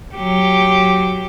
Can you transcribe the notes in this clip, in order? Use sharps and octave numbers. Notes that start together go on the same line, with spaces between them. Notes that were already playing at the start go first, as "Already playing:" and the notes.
F#3 G4